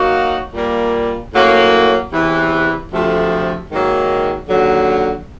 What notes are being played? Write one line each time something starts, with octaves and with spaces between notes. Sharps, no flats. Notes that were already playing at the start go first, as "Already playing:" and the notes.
Already playing: F#3 A#3 D#4 F#4
A#2 G3 A#3
A2 F#3 A#3 C#4
E2 C3 E3
D2 C3 F3 A3
G#2 D#3 F#3 A#3
D#2 D3 F#3